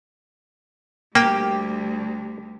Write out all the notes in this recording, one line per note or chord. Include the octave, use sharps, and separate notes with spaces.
D2 G3 A#3 G4